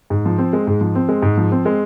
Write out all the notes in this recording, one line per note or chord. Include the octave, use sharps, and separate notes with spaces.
G#2
F3
C4
G#3
G#2
F3
C4
G#3
G#2
F3
C4
G#3